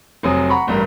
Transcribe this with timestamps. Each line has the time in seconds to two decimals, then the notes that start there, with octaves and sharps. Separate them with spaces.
0.23 F1 C3 F#3 G#5 D#6
0.50 F#5 A#5 B5 C#6
0.67 A1 G2 G3 A#4